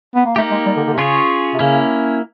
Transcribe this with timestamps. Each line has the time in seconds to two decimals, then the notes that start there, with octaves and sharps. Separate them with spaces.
0.15 B3
0.25 A#3
0.36 A3 A#3 D#4 G4
0.51 G#3
0.66 G3
0.77 D3
0.87 D3
0.93 C3
0.98 C#3 C#4 F4 G#4 C#5
1.54 C3
1.59 C#3 A#3 C#4 E4